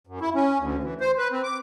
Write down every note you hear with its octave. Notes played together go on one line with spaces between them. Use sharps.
F#2
E4
C#4
D2
E3
C5
B4
C4
D6